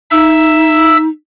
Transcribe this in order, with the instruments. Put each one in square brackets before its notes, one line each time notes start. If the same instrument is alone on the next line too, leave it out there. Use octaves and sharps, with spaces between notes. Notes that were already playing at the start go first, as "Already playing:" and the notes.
[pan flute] D#4 [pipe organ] E5 E6